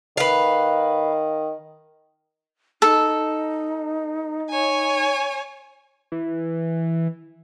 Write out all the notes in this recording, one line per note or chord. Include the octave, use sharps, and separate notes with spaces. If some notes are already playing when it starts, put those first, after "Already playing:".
D#3 B4 F5
D#4 A4
C#5 G#5
E3